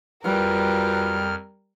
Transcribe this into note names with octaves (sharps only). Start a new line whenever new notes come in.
F2 G3 F4 F#4 A#4 B4 F6